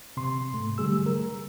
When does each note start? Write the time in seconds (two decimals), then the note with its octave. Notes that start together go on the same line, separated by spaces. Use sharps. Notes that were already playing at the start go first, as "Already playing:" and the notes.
0.17 C3 C6
0.53 G#2 A3
0.78 D3 F#3 G3 A3 G#4 E6
1.06 A#4